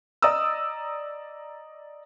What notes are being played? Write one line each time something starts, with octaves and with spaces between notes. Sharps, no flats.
D5 D#5 A#5 D#6 E6